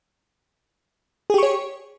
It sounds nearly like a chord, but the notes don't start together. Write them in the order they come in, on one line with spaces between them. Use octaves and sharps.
G#4 G4 C#6 C#5